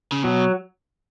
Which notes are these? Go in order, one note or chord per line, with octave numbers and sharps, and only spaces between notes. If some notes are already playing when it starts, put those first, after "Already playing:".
C#3
B2 F#3